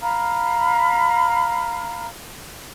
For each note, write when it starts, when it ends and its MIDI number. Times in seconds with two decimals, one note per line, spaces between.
0.01 2.08 77
0.01 2.08 82
0.01 2.08 83
0.01 2.08 89